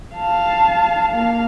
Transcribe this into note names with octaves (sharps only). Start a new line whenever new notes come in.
F5 A5
A#3 F5